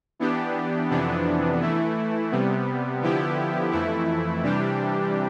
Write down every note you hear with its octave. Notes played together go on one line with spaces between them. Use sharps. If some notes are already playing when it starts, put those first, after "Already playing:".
E3 B3 D4 G4
F2 C3 E3 B3 D4
E3 A3 E4
C3 G3 B3
D3 F3 B3 E4 G4
F2 E3 A3 E4
C3 E3 G3 D4 G4